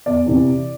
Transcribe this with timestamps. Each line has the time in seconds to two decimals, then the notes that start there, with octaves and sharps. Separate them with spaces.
0.06 E2 D5
0.26 C3 E3